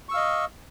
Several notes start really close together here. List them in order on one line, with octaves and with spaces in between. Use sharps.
C#6 E6 F5 D#5